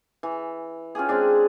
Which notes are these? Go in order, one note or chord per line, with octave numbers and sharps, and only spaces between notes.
E3
C#4 F4 G4 G#4
G#3 C4 D4